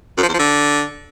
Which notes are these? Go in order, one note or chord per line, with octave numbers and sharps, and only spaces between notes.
F#2
F3
E2
F3
D3